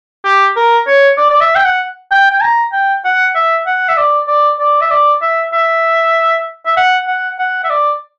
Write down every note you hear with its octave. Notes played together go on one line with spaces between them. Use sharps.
G4
A#4
C#5
D5
D5
E5
G5
F#5
G5
G5
A#5
G5
F#5
E5
F#5
E5
D5
D5
D5
E5
D5
E5
E5
E5
F#5
F#5
F#5
E5
D5